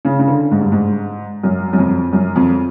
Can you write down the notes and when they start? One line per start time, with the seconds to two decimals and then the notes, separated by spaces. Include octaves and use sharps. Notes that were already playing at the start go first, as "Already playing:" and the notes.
0.05 C#3
0.19 C#3
0.28 D3
0.51 G#2
0.61 G2
0.72 G#2
1.43 F#2
1.73 F#2
1.78 F2
2.13 F#2
2.36 F2